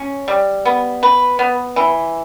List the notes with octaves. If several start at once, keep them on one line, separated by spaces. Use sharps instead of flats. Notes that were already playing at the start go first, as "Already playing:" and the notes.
Already playing: C#4
G3
B3
B4
B3
E3